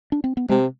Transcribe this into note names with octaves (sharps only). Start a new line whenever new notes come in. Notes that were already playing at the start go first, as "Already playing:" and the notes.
D4
C4
B3
C3 G#3